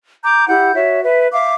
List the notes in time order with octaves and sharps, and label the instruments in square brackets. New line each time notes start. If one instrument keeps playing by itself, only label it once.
[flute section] A#5 D6 G6
E4 G4 F#5 G6
F#4 C#5 E5
B4 E5
E5 F5 D6